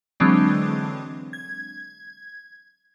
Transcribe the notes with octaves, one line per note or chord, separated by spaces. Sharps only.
D3 E3 F#3 G#3 C4 D4
G#6